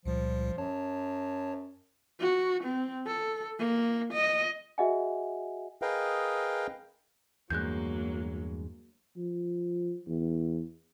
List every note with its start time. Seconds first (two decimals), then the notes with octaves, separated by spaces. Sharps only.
0.05 C#2 A#2 F3 G3
0.58 F#2 C#5 A5
2.20 F#4
2.64 C4
3.07 A4
3.59 A#3
4.13 D#5
4.78 F#4 G#4 D#5 E5 F#5 G#5
5.82 G#4 A#4 B4 D#5 F5 G5
7.50 E2 G2 F#3 G#3 A#3 F#6 G6
9.17 F3
10.07 E2